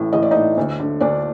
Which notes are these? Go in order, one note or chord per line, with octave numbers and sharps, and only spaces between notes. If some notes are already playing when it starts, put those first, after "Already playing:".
Already playing: A1 A2
A1 D#5
D5
A2 D#4 D#5
D2
D3
D2 D4 D5